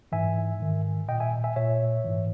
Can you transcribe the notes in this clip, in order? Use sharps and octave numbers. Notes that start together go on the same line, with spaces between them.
G#2 E3 E5 G#5
G#2 D#3
A#2 D#5 G5
E5 G#5
E5 G#5
A#2 C#5 E5
G#2 E3